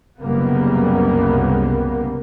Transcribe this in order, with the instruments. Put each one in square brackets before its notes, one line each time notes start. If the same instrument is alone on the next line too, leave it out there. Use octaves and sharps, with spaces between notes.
[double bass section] F#1 C2 C#3 G3 A#3 B3